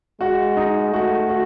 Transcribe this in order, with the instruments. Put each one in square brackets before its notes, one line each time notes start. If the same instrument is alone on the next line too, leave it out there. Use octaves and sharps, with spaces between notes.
[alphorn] G#3 [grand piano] F#4
[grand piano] D#4
[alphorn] A3 [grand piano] F#4
[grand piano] F#4